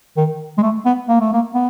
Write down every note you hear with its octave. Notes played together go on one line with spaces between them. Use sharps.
D#3
G#3
A3
B3
A#3
A3
A#3
B3